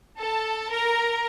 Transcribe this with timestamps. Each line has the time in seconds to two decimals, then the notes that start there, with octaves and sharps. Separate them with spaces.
0.18 A4 A5
0.70 A#4 A#5